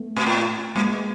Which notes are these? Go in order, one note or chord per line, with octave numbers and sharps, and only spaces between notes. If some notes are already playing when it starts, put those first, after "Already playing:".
Already playing: A3 B3
A#2
A2
A#2 G#3 A#3
B2